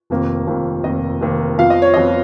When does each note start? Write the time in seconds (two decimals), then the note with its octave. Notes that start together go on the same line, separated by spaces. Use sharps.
0.10 F1 F2 D#3 A#3
0.47 F1 F2 D#3 A#3
0.84 F1 F2 D#3 A#3 D#5
1.21 F1 F2 D#3 A#3
1.58 F2 F3 B3 F5
1.70 D#5
1.82 C#5
1.94 F2 F3 B3 D#5